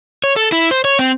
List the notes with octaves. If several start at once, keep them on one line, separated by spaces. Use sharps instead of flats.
C#5
A4
E4
C5
C#5
C4